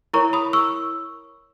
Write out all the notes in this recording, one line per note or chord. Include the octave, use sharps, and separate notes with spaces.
E4 A#4 C#5 A#5 C#6
B5 D#6
C#6 E6